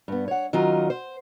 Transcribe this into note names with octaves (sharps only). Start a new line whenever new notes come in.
G2 B3
C#5 F#5
D#3 F#3 C#4 F4 D#5
C5